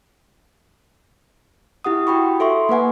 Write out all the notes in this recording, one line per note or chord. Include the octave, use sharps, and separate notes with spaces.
E4 G4 F#5 D#6
F#4 G5 B5 C#6
A4 E5 C6 C#6
A#3 B4 F#5 G#5